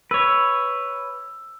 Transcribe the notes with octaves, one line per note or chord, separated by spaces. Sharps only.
B4 C#5 E6